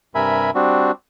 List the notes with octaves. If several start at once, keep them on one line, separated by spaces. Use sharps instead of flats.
G2 C3 A#4 E5 G#5 B5
G3 C4 D4 F#4